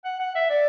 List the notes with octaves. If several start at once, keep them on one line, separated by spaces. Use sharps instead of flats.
F#5
F#5
E5
D5